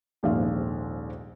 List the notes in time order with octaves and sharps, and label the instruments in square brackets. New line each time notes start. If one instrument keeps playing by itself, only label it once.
[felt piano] D#1 A#1 G#2 F5